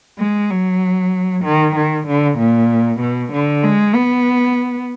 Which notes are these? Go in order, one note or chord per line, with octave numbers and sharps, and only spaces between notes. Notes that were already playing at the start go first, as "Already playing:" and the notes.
G#3
F#3
D#3
D#3
D3
A#2
B2
D3
G#3
B3